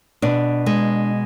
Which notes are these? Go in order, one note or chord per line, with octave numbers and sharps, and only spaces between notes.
B2 D4
G#3